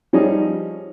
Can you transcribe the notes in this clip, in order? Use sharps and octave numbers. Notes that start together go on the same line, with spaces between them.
F3 G3 C#4 D#4 E4 G#4